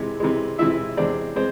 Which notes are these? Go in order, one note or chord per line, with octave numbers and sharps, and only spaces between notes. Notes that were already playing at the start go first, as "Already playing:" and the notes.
Already playing: C3 E3 G#3
C3 E3 G#3
C3 E3 G#3 E4 E5
E2 C3 G#3 C4 D4 D5
G#3 C4 C5